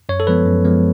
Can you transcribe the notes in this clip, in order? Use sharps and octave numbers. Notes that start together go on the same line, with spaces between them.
F#2 C#5
A4
F3 G#3 B3 B4
F#2
F3 G#3 B3